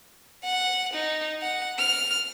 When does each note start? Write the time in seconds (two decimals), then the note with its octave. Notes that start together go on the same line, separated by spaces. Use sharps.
0.44 F#5
0.94 D#4
1.42 F#5
1.78 F6